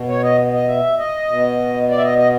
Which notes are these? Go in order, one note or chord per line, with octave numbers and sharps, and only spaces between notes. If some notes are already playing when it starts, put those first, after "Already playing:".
Already playing: B2
C#5
D#5
D#5
E5
D#5
B2
D5
E5
D#5
D#5